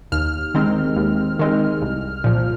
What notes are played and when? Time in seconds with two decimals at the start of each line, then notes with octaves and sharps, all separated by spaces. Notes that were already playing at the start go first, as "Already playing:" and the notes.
0.12 D#2 F6
0.54 D#3 G#3 C4
0.96 D#2
1.39 D#3 G#3 C4
1.82 C2
2.24 A#2 F3